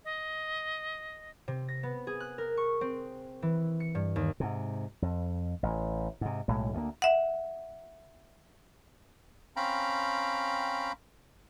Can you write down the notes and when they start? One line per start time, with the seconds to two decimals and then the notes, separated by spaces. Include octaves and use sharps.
0.05 D#5
1.48 C3
1.68 A#6
1.83 B3
2.07 G#4
2.20 F#6
2.38 A#4
2.57 C#6
2.81 C4
3.42 E3
3.80 C#7
3.95 G2
4.16 D#2
4.40 G#2 C3
5.02 F2
5.63 A1
6.21 G#2 C3
6.48 B1 A2 G#3
6.73 D2 D3 A#3
7.02 E5 F#5
9.56 C4 C#4 F5 G5 A#5 B5